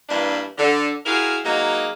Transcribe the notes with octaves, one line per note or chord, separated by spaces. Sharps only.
G2 E3 A#3 D4 E4
D3
E4 F#4 G#4 A#4 F5
F#3 G#3 A#3 D#4